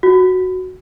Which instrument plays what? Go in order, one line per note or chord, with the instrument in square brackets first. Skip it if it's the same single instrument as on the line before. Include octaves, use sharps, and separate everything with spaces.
[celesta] F#4